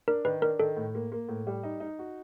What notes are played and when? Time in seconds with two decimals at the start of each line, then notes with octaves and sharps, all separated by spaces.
0.08 D4 A#4
0.25 D#3 B4
0.42 D4 A#4
0.59 D#3 A4
0.77 A2
0.95 A#3
1.12 A#3
1.29 A2
1.47 G3
1.63 D#4
1.80 D#4
1.99 F#4